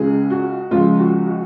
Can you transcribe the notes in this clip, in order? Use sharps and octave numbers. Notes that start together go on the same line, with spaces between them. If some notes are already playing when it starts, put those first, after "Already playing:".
Already playing: C#2 C#3 G#3 G#4
F#4
C#2 C#3 F3 G#3 F4
F#4
F#4